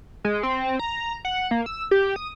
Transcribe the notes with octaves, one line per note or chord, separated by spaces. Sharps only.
G#3
C4
A#5
F#5
A#3
E6
G4
D#6